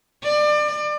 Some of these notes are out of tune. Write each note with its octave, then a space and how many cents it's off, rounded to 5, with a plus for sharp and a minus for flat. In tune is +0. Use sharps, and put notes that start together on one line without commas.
D5 +30